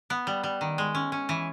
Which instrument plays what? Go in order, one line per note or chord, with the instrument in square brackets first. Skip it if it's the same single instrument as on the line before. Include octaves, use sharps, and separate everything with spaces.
[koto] B3
G3
G3
D#3
G#3
C#4
C#4
E3